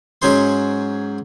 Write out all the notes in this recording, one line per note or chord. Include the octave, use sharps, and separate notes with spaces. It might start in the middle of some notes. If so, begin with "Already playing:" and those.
G#2 F#3 C#4 G#4 C5 C6